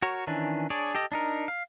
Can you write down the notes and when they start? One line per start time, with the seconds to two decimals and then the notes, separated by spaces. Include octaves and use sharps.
0.02 F#4 A#4 C#5
0.27 D#3 E3 C#4 D4
0.70 D4 G#4 C#5 D5
0.95 G4 A4 D#5
1.12 D4 D#4 A#4
1.48 F5